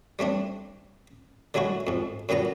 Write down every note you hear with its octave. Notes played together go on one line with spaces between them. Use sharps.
G3 A3 C4 D4
D3 F#3 G#3 E4 F#4
F2 G#2
F#2 A#2 D3 B3 A#5